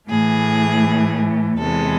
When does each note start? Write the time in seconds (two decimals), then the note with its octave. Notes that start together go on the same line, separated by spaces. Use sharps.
0.09 A2 E3 A3 G#4
1.60 E2 C3 E3 G#3 A4